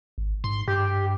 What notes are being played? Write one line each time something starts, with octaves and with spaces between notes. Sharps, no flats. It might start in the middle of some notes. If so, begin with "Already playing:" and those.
G#1
G#2 C6
G2 G4